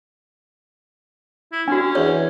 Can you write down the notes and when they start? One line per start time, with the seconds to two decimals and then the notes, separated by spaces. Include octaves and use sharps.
1.52 E4
1.68 C#4 D4 F#4
1.95 E2 C#5